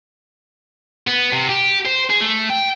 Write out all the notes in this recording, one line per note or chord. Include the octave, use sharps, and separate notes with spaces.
B3
C3
G4
C5
G#4
A3
G5